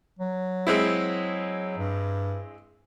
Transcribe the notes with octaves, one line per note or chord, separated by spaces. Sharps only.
F#3
G#3 C4 E4
G2